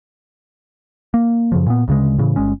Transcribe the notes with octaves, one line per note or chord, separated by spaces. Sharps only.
A#3
F#2 C#3 F3
A#2 B3
D2 C#3 G#3
A2 C#3 E3
G1 G#3 C#4